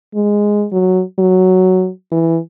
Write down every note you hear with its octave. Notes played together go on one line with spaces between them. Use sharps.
G#3
F#3
F#3
E3